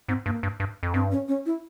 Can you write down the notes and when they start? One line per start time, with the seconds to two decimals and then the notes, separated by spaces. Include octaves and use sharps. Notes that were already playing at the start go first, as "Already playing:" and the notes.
0.08 G#2 C4
0.26 G2 A#3
0.43 G2
0.60 G2
0.83 F2
0.94 G2 C4
1.12 C#4
1.28 C#4
1.46 E4